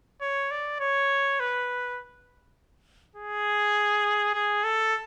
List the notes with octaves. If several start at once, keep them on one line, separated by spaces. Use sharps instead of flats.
C#5
D5
C#5
B4
G#4
G#4
A4